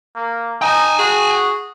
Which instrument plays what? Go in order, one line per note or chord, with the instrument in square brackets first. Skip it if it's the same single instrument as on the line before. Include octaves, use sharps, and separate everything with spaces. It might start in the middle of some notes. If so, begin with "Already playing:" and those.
[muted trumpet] A#3
[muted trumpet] D#4 [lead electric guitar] G5 G#5
[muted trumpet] F#4 [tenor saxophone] G#4